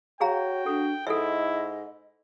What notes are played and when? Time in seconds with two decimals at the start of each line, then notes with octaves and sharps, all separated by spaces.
0.21 F#4 G#4 C#5 F5 G5 A#5
0.66 D4 A4
1.07 G#2 E4 A4 D#5 E5